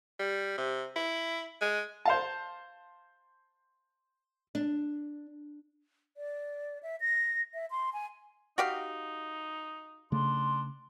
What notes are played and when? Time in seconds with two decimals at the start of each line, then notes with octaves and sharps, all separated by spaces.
0.19 G3
0.58 C3
0.96 E4
1.61 G#3
2.05 C5 F5 A5
4.55 D4
6.17 D5
6.83 E5
7.01 A#6
7.54 E5
7.71 C6
7.93 G#5
8.58 D#4 F#4 G4 F5
10.12 C#3 A3 D4 C6